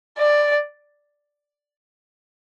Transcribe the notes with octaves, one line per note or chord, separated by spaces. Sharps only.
D5